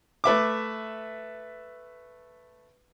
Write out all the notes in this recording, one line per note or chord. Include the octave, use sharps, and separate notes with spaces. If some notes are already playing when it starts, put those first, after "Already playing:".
A3 B4 E5 D6